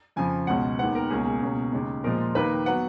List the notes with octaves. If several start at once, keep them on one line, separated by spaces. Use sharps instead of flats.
F2 C#3 F3 G#5
C#2 B2 G#3 C#4 F#5
D#2 D#3 G#3 B3 F#5
A#4
C#2 B2 A#3 C#4 G#4
G#4
C#2 B2 A#3 C#4
D#2 C#3 G#3 C#4
A#2 F3 G#3 A#4
D#2 D#3 A#3 B4
F#3 B3 F#5